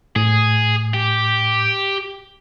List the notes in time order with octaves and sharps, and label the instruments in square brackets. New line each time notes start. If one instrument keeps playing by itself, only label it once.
[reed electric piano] A2 [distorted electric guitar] G#4
[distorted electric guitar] G4